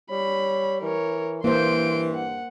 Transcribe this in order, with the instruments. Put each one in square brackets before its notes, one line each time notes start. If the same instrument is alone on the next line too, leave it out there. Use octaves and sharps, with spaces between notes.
[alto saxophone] G3 [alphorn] C#5 [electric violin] B5
[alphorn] E3 [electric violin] A#4 C#5
[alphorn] G2 [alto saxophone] E3 [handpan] A#3 C5 [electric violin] C6 D7
[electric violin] F#5